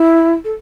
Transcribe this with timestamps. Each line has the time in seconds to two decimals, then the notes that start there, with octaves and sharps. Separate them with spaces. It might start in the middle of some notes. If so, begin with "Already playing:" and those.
Already playing: E4
0.44 A4